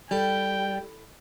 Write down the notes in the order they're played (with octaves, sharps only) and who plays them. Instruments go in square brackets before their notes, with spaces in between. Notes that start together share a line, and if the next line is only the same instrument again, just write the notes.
[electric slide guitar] G3 [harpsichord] E4 A4 [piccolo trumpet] G5